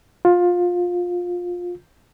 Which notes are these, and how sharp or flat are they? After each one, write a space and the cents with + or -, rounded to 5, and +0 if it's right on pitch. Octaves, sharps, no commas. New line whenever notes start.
F4 +20